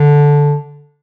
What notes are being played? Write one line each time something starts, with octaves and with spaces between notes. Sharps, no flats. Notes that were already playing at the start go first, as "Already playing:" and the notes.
Already playing: D3